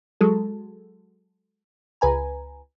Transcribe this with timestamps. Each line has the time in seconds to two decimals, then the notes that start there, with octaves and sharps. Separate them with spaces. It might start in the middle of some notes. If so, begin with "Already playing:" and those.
0.21 F#3 G#3 A4
2.01 C#2 B4 G#5 A#5